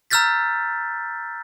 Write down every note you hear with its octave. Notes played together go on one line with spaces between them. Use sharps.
A#5 E6 F6 G6 A6 B6